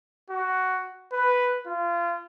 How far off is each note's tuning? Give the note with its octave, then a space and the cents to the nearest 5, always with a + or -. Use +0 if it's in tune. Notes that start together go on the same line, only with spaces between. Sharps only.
F#4 +10
B4 +0
F4 -25